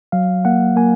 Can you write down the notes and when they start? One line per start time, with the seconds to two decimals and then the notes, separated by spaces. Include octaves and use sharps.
0.12 F#3 F5
0.45 A#3 F#5
0.76 A#3 G#5